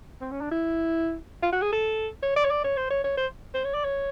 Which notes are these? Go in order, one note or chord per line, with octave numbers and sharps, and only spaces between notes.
C4
C#4
D4
E4
F4
F#4
G#4
A4
C#5
D5
C#5
D5
C#5
C5
C#5
C#5
C5
C5
C#5
D5
C#5